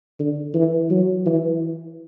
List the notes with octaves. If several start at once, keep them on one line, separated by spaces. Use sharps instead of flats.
D3
E3
F#3
E3